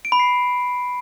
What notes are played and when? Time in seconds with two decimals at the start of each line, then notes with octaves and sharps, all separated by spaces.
0.05 D7
0.12 B5
0.19 C7